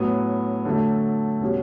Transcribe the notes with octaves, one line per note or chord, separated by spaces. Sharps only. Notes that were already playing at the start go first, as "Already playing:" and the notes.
Already playing: A2 F#3 B3
D3 F#3 A3
B2 G3 C#4 F#4